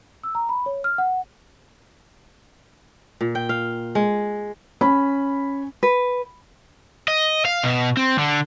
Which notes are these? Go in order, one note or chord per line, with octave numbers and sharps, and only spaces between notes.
E6
A#5
B5
C#5
F6
F#5
A#2
G5
F5
G#3
C#4 B5
B4
D#5
F5
B2
C4
D3